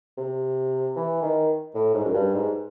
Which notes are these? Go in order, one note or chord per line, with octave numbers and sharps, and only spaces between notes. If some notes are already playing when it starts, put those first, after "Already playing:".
C3
E3
D#3
A2
G#2
F#2
G2
G#2